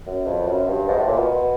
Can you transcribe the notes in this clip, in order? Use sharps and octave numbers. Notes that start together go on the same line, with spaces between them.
F#2
F2
F#2
G2
G#2
A2
A#2
B2